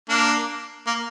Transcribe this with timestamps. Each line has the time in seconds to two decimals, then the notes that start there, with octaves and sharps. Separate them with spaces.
0.09 A#3 D4
0.87 A#3